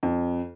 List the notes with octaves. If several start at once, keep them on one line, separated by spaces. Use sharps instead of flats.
F2